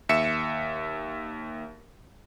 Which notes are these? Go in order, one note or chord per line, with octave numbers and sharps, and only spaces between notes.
D#2 E5 C#7 E7